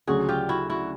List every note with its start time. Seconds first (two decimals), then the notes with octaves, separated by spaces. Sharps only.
0.07 D2 C#3 F#3 F#4 G#4
0.28 F4 G4
0.49 E4 F#4
0.70 E4 F#4